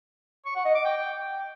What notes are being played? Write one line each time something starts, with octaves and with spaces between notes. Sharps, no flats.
C#6
F#5
D#5
D6
G5